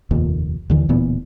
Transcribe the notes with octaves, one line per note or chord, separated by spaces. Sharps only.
F1 D#2 A#2
D#2 D3 E3
D1 A#2 E3 B3